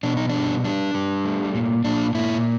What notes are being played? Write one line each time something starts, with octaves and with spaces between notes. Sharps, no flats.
B2 D4
D#4
D4
G3
G3 D4
G3
A3
A#2
A#2 D4
A#2 E4